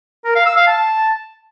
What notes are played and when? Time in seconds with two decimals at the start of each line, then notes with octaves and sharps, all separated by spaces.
0.25 A#4
0.35 F5
0.46 E6
0.56 F5
0.67 A5